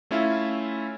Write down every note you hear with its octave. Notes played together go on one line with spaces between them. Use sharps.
A3 C#4 E4 F4 E5